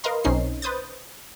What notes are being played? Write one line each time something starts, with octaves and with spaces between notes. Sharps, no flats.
A#4 B4 D#5 F5 A#5 C6
B1 C4 C#4 D#4 C7
B4 C5 D#6 G6 A6